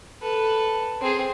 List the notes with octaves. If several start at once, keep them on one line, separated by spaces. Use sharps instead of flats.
A4 B4
C4 G#4